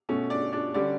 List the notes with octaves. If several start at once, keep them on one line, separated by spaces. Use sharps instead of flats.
B2 A3 C#4
D4 D5
D4 D5
D3 G3 C#4 D4 D5